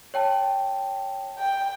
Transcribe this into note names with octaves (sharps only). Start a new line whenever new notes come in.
C#5 G5 A5
G5